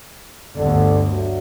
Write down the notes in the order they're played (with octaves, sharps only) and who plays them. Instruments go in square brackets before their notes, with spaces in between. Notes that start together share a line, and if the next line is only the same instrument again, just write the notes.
[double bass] G1 D2 [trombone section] D3
[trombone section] D3 F#3 A3